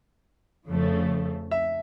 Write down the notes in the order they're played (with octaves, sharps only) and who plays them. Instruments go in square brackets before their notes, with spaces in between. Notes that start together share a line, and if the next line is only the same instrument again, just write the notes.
[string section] F2 C#3 F3 A3
[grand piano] E5